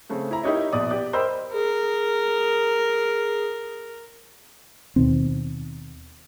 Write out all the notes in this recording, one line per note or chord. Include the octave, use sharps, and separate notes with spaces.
C#3 A3 C4
E4 A#5 B5
D#4 E4 G4 A#4 C#5 D#5
A#1 B2 D5 D#6
G4 D5
A#4 C5 D#5 G5 B5 E6
G#4 A#4
D#2 B2 D#3 C4